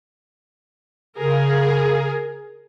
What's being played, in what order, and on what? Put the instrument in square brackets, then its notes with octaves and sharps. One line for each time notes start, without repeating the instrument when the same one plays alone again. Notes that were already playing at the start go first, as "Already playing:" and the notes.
[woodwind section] C#3 [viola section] G#4 A#4